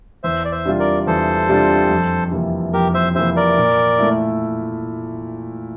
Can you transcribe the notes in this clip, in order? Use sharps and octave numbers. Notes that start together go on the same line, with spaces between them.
E2 C5 E5
D5
C5 E5
C3 G3 D4 F4
A#4 D5
E2 A4 C5
C3 G3 D4 F4
F2
C3 E3 A#3
F2 G4 A#4
C5 E5
C3 E3 A#3 C5 E5
A#4 D5
A#2
A3 E4